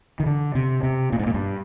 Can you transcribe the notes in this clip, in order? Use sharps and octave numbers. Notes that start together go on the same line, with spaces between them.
D#3
D3
C3
C3
A#2
G#2
A#2
G2